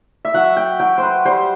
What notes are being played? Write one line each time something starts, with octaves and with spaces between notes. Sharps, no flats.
E5
F#3 F#5
G5
F#3 G5
C5
B4
G3 C5